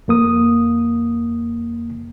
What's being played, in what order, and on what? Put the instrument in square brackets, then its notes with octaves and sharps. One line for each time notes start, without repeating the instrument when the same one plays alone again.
[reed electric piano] F2 A#3 D#6